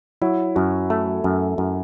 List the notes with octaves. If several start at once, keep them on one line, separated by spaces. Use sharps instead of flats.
F#3 E4
F#2 F#4
A3 A4
F#2
F#2